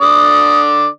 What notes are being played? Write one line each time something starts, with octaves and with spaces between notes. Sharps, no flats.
D3 D5 D#6